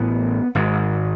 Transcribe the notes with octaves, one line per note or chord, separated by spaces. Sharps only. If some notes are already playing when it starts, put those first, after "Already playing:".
Already playing: A1 A2 B3
G#1 G#2